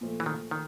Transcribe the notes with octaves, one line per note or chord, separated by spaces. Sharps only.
A#2 F3 A3
E3
D#3
D#3